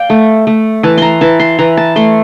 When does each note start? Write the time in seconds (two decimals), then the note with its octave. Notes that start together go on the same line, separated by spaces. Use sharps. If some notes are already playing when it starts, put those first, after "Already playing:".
Already playing: D5 F5 G5
0.10 A3
0.47 A3
0.83 E3 A5
0.98 A#5 C6
1.21 E3 A5
1.39 C6
1.58 E3 A#5
1.77 A5
1.96 A3 C6